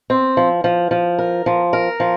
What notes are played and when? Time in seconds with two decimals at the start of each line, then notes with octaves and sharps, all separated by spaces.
0.10 C4
0.37 F3
0.64 F3
0.91 F3
1.18 A#4
1.46 F3
1.73 A#4
2.00 F3